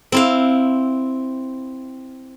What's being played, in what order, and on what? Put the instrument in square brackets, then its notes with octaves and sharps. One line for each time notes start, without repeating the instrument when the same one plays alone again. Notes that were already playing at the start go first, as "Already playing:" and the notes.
[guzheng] C4 E4 F5